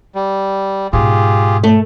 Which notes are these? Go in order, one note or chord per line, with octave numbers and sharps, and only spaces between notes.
G3
G#2 B2 F4 G4 G#4
A3